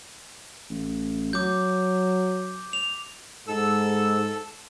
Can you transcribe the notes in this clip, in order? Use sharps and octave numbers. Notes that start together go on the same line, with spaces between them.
A1
F#3 D6 G6
F7
G#2 A4 E6